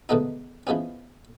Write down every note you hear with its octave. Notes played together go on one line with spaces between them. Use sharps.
G#2 B2 D3 A3 B3 D#4
E3 F3 G#3 B3 C#4